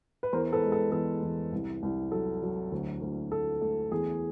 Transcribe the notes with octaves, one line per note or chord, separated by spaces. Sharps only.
B4
E2 A#4 C5
A4 B4
G#3
A4
E2 A4
E2
C2
C2
F#3 A4
F#3
D2
D2
A3 A4
A3
E2 G#4